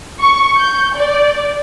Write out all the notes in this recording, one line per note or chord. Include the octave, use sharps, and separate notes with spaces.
C#6
G6
D5